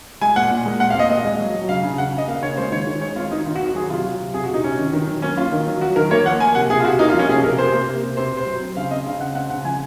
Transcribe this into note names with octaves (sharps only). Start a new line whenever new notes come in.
G#3 G#5
A#2 F#5
A#2
G#3
A#2 F#5
F5
C4 D#5
A#2 D#5
G#3
F#3
F#3
C#3 F5
C#3
C#3 F#5
C#3 D#5
A#3 F5
C#3 C#5
G#3 C5
D#3 C#5
D#3
G#3 C#5
C4 F4
D#3 D#4
D#3 F4
F#4
C4
F#4
F#3 G#4
C3 F4
F#3
C3
C3 G#4
F#4
C3 D#4
C3 C#4
D#3
D#3
F#3
A#3 C#4
A#3 F4
D#3
F#3
F#3 F#4
D#3 A#4
A#3 C#5
F3 F#5
A#3 G#5
C3 F#5
C3 G#4
F4
C3 F#4
A#3 D#4
F4
F3 C#4
C3 G#4
C3 A#4
C3 C5
A#3
C3
C3
C3 C5
C3 C5
F#3
C4
C#3 F5
C4 D#5
C#3 F5
C#3 F#5
C4 F#5
C#3 F#5
F3 G#5